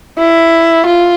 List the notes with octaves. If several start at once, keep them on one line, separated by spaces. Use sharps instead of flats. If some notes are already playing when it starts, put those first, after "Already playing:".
E4
F4